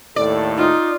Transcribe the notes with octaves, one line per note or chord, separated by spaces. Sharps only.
D#2 A2 A4 D5
D#4 F4